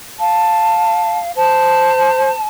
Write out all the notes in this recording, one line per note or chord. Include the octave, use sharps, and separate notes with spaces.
F5 A5
C5 A5